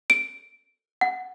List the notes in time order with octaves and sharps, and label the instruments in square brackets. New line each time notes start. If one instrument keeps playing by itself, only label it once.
[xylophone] D7
F#5